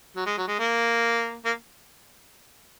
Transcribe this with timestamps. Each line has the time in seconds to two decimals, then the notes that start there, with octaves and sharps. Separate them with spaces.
0.16 F#3
0.26 G#3
0.37 F#3
0.48 G#3
0.59 A#3
1.45 A#3